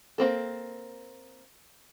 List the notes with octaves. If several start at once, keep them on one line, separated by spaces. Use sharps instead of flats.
A#3 C4 A4